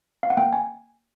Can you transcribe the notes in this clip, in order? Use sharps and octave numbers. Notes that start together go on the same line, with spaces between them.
F5
F#5
A#3 G5
G#5